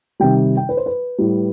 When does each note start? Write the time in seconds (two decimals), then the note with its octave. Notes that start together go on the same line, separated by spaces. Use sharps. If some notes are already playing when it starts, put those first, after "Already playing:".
0.20 C3 D#3 G3 G5
0.57 G5
0.69 B4
0.77 C5
0.86 B4
1.18 A2 G3